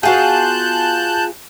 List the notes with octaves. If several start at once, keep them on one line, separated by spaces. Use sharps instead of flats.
B3 F4 F#4 G#4 F#5 A5 F#6 G6